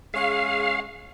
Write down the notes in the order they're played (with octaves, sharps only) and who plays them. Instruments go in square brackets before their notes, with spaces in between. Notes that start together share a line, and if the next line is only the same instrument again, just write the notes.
[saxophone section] G#3 C#4 G#4 [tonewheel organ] F5